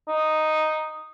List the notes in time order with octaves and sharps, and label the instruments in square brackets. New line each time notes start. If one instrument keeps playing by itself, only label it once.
[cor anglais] D#4